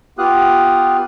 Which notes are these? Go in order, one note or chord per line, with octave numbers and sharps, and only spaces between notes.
B3 F4 G4 F5 D#6 F#6